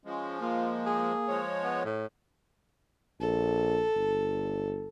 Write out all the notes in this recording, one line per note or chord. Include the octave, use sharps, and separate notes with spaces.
F3 G#3 C#4
A#3 F4
G#4
F3 G#3 C#5
B3
A2
A#1 A4
G1